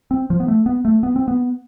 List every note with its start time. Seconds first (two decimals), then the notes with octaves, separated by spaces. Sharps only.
0.11 C4
0.30 F3
0.40 B3
0.48 A3
0.66 B3
0.85 A3
1.03 B3
1.16 C4
1.28 B3